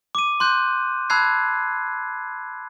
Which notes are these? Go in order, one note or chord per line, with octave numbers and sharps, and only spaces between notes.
D6 D#7
C6 F#6 G6
A5 B5 E6 F#6 G#6 C7